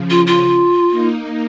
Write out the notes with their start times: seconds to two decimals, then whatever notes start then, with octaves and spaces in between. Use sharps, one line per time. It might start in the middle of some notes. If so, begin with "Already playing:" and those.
Already playing: C#3 F3
0.10 F4
0.26 F4
0.90 A#3 D#4